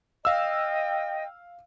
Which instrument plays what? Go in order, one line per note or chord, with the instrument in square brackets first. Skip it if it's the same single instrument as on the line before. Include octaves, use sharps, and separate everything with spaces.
[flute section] D#5 G5 [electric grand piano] F5 E6